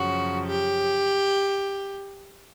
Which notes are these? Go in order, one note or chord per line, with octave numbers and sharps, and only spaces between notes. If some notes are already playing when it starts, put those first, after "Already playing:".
Already playing: F#2 C#3 F3 F#4
G4